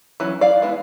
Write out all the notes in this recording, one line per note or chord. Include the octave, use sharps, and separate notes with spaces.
E3 F#3 C#4
D5 F5
G#3 B3 E4